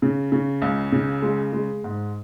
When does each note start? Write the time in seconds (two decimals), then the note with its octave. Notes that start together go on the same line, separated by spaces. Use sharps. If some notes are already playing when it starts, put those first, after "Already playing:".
0.02 C#3
0.32 C#3
0.62 C#2
0.92 C#3
1.22 G#3
1.53 G#3
1.84 G#2